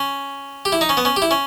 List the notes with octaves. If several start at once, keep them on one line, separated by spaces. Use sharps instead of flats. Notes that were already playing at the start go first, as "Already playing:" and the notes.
Already playing: C#4
G4
E4
D#4
C#4
B3
C#4
G4
E4
C#4